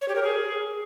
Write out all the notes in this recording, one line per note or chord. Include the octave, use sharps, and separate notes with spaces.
C#5
G4
A#4
G#4